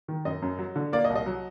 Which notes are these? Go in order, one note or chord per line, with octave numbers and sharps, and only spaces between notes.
D#3
F#2 D#5
F#2
F#3
D3
A#3 D5
D#5
C2
D#5
F#3